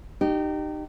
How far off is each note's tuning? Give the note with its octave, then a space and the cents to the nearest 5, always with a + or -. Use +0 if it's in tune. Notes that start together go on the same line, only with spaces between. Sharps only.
D#4 -30 G4 -15